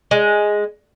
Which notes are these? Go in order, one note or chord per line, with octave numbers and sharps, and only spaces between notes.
G#3